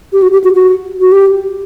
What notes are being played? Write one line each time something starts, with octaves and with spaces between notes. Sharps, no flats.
G4
F#4
G4
F#4
F#4
F#4
G4